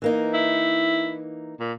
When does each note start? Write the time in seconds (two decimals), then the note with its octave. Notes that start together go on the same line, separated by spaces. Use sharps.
0.02 E3 A#3 D#4
0.34 E4
1.60 A#2